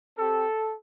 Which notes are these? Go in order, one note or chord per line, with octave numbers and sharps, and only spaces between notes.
C4 G4 A4